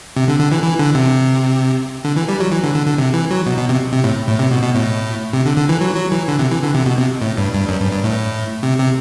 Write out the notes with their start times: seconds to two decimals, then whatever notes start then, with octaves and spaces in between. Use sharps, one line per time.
0.16 C3
0.28 D3
0.40 D3
0.52 E3
0.63 E3
0.79 D3
0.95 C3
2.05 D3
2.16 E3
2.29 G3
2.40 F#3
2.52 E3
2.63 D3
2.75 D3
2.86 D3
2.98 C3
3.14 E3
3.30 F#3
3.46 B2
3.57 B2
3.69 C3
3.92 C3
4.04 A2
4.28 A2
4.39 C3
4.51 B2
4.63 B2
4.74 A2
5.33 C3
5.45 D3
5.57 D3
5.69 E3
5.81 F#3
5.96 F#3
6.12 E3
6.28 D3
6.39 C3
6.51 E3
6.63 D3
6.75 C3
6.86 B2
6.98 C3
7.22 A2
7.37 G2
7.53 G2
7.69 F#2
7.81 G2
7.92 G2
8.04 A2
8.63 C3
8.78 C3